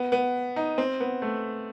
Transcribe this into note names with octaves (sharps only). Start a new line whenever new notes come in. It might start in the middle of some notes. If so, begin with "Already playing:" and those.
Already playing: B3
B3
D#4
C4
B3
A3